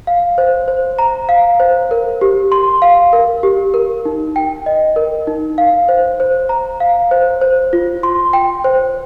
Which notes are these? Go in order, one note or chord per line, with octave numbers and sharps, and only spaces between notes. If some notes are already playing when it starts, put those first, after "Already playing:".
F5
C5
C5
A#5
F5
C5
A#4
G4
C6
F5
A#4
G4
A#4
D#4
G5
D#5
A#4
D#4
F5
C5
C5
A#5
F5
C5
C5
F4
C6
G5
C5